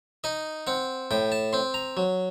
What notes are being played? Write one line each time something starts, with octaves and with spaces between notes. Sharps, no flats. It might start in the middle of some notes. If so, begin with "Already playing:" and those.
D#4 D#5
C4 F#5
A2 G5
A5
C4 C6
A#5
F#3